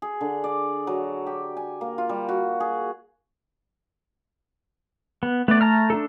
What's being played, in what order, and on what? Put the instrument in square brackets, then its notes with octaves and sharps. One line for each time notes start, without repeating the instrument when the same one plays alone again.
[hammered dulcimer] G#4
D3
D5
F#3
G4
G#5
A#3
F4
G3
F#4
G#4
[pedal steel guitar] B3
[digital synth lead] A3 [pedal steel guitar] B3 D5
[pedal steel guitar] A5 A#5 F6
D4 F4 A4